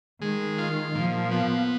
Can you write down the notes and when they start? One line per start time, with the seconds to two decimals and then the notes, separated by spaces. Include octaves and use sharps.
0.22 D#3 G#3
0.58 F4
0.95 A#2 F3
1.31 B3